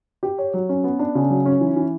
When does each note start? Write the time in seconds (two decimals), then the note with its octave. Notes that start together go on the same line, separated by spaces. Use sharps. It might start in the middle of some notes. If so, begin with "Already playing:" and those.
0.23 G4
0.38 C#5
0.54 F#3
0.69 C#4
0.84 B3
0.99 D4
1.15 C#3
1.30 F#3
1.46 C#4
1.61 E3
1.76 E3